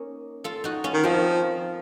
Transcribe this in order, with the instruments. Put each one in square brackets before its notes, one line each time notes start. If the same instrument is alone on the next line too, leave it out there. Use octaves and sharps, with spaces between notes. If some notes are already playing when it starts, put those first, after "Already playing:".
Already playing: [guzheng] A#3 C#4 D#4
F4 A4
D#4 F#4
C#4 F4
[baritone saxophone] D#3
[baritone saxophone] F3 [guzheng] C4 D#4